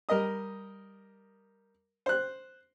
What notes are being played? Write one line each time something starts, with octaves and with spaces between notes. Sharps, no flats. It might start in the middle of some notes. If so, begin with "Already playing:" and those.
G3 A#4 D#5 D#6
C5 F#6